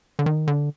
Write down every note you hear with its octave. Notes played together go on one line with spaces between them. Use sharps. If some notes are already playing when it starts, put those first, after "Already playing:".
D3
D#3
D3